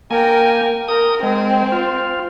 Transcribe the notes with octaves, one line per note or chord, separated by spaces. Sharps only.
A#3 A#4 G5 G#5
A#4 D#6
G#3 C4
F4